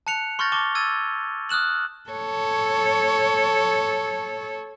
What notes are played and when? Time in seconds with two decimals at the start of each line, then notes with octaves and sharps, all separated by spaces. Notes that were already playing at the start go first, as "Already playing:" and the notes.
0.07 A5 F#6 C#7 F7
0.39 C6 C#6 F6 G6 A6 A#6
0.52 A5 C#6 D6 A6 G7
0.75 E6 G#6 A6 D#7
1.49 D#6 F6 F#6 E7 F#7
2.10 A4 C#5